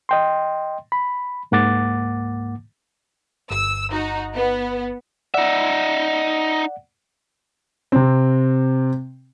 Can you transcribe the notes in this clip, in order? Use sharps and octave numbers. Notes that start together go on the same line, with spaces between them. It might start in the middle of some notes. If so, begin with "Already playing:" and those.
D#5 G5 C6
B5
C#2 G#2 A#3 F#5 D6 A6
G1 E6
D#4 F#4
B3
D#4 D5 E5 F#5
C3 C4